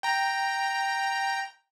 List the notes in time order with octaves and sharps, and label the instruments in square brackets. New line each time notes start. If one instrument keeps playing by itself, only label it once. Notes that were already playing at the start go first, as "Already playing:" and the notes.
[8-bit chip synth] G5 A#5